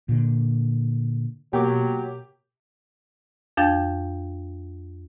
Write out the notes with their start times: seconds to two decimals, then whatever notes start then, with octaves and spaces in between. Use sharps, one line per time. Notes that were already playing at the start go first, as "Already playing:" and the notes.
0.09 A#2 D3
1.53 B2 F#3 A#3 G4 D6
3.57 F2 D4 F5 G5 G6 A6